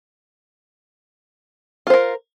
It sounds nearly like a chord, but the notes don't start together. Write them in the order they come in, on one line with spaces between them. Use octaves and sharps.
F4 C5 A#4